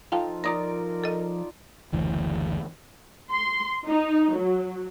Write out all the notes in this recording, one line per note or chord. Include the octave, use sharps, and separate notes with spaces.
F3 D#4 F4 A4 F5 G5 A5
D#4 F4 A#4 D5 A#5 D#6 A#6
A4 D#5
F#1 D2 E3
C6
D#4
F#3